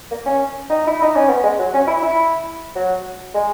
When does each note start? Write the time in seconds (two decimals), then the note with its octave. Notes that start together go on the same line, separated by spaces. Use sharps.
0.11 A#3
0.26 C#4
0.70 D#4
0.87 E4
1.02 D#4
1.16 C#4
1.29 B3
1.44 G#3
1.59 F#3
1.74 C#4
1.88 E4
2.03 E4
2.76 F#3
3.34 G#3